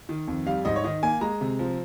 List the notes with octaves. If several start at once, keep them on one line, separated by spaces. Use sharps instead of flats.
D#3
F2
G3 F5
G#2 D#5
C#5
D#3 D#5
A#3 G#5
G#3 A#5
C3
F3